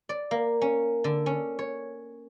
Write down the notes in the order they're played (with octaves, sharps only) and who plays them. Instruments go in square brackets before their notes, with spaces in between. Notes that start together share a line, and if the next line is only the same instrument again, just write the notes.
[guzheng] D5
A#3
C#4
D3
C#4
C#5